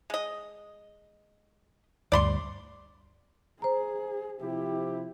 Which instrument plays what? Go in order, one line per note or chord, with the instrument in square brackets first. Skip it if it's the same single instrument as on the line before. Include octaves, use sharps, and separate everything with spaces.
[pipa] G#3 D#5
[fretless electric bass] D2 G2 [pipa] D5 B5 C6
[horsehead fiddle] G#4 [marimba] C5 A#5
[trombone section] C3 F3 G4 [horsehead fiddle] E4